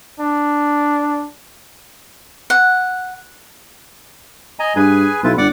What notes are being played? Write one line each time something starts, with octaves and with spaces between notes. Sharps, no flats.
D4
F#5
D#5 G#5 A#5
G2 G#4 B4 G#5
B1 E4 F4 B4
G1 D5 F#5 D6